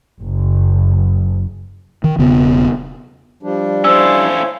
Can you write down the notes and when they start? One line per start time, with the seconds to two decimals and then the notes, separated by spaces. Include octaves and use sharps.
0.21 F#1
2.04 D#3
2.19 E1 C#3 B3
3.43 F3 G3 D4
3.84 C#4 E4 A4 C5 F5 E6